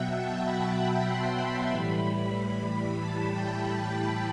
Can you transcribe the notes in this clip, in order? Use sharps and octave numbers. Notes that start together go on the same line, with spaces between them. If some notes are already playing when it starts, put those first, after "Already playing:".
Already playing: B2 F#3 E5 F#5 G5
A5
B5
C6
A2 E3 G3 B5
B5
A5
G5
A5